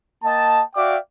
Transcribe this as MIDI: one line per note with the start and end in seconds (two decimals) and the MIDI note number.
0.24 0.62 58
0.24 0.62 75
0.24 0.62 79
0.24 0.62 81
0.76 0.97 66
0.76 0.97 74
0.76 0.97 76
0.76 0.97 77
0.76 0.97 79
0.76 0.97 86